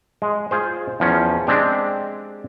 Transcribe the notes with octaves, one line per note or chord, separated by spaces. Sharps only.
G#3
F4 G#4 C5
E2 F3 C#4
G#3 C4 D4 G4